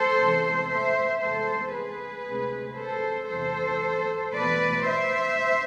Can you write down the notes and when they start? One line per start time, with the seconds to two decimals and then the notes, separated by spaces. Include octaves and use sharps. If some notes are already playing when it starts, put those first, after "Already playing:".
Already playing: A4 C5
0.18 E2 C3 E3 G#3
0.70 C5 E5
1.22 E2 C3 G#3 A4 C5
1.74 G#4 B4
2.26 D2 C3 G#3 C4
2.78 A4 C5
3.30 E2 C3 E3 A4 C5
4.34 E2 B2 A3 B4 D5
4.86 C5 E5